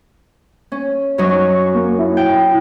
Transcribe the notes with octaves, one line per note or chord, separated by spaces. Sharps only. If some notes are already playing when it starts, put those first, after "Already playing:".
C#4
F#2 F#3 D#4 C#6
A#3
E4
G5